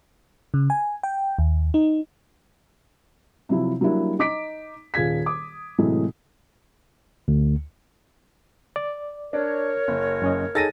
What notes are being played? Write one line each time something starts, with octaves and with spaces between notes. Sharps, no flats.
C#3
G#5
G5
D#2
D#4
C3 F3 F#3 E4
F#3 G3 A#3 D4 E4
D#4 D6 B6 D7
D#1 F4 G#4 G#6 B6
D6 D#6
A2 C3 E3 F#3 G#3 A3
D2
D5
D4 A#4 C#5
F#1
F#2 C#4 D#5
D#4 G#4 A4 A6 A#6 D#7